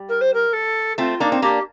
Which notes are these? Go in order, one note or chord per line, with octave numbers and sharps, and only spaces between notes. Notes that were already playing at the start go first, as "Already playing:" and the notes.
Already playing: G3
A#4
C5
A#4
A4
A3 C4 F4
A#3 D4 D#4
C4
A#3 D4 G4